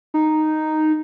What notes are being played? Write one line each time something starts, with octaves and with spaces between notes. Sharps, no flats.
D#4